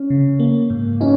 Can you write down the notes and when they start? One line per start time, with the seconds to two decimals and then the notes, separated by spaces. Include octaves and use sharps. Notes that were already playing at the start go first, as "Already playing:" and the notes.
Already playing: C#4
0.10 C#3
0.40 A#3
0.70 G#2
1.00 C#4 D#4